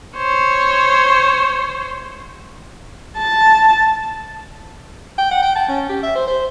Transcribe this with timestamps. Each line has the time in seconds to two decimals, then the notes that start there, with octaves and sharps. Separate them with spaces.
0.17 C5 C#5
3.18 A5
5.18 G5
5.31 F#5
5.43 G5
5.56 A5
5.68 C#4
5.89 G4
6.03 E5
6.16 C5
6.27 C5